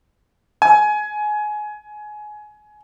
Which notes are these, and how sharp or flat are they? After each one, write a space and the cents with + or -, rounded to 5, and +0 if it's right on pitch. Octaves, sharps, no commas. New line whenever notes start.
G#5 +20